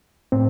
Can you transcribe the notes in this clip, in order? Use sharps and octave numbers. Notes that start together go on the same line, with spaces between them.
A2 C4